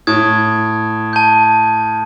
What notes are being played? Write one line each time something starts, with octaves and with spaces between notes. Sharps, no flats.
A2 D#6 G#6
A5 G6